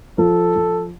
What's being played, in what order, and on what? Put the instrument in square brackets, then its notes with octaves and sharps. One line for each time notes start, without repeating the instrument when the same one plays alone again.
[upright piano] F3 [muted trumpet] A4
[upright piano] F3